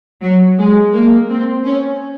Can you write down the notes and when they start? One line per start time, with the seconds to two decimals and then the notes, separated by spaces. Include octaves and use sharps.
0.22 F#3
0.58 G#3
0.94 A#3
1.30 C4
1.65 C#4